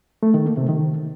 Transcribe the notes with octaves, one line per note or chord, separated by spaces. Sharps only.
A3
D#3
A#3
C3
D#3